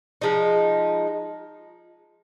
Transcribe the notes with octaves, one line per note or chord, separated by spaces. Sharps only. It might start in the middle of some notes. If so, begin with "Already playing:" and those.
F3 G#3 D#4